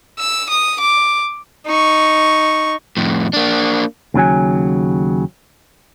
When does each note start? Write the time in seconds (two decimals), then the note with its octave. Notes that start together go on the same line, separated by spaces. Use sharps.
0.19 E6
0.50 D#6
0.81 D6
1.66 D#4 C#6
2.97 F2 A2
3.33 A#3 D4
4.14 D#2 C#3 F#3 G#5